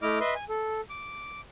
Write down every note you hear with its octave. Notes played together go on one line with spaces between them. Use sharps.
A3 E4 D#5 D6 F6
B4 D#5 E5 C6
G#5
A4
D6